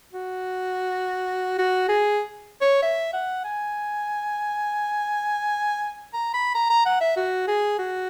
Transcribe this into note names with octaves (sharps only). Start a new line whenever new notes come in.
F#4
F#4
G#4
C#5
E5
F#5
G#5
A#5
B5
A#5
A#5
F#5
E5
F#4
G#4
F#4